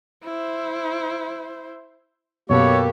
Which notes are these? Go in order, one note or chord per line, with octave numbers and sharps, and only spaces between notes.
E4 C5
F#2 B2 A#3 G4 A4 B4 C#5